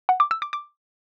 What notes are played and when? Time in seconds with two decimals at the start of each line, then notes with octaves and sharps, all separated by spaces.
0.09 F#5
0.20 D6
0.31 E6
0.42 D6
0.53 D6